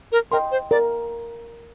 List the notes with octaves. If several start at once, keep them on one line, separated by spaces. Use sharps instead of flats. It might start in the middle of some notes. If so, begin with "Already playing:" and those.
A#4
A#4 D#5 G5 C6
C5
A#4 D5